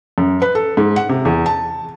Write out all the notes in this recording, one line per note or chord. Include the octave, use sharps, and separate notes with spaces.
F#2
B4
A4
G#2
F#5
C3
E2
A5